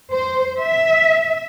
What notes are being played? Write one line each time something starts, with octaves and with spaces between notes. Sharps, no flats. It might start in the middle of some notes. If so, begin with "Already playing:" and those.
C5
E5